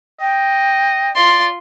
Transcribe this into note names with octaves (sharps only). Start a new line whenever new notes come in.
D#5 G5
F4 D5 C6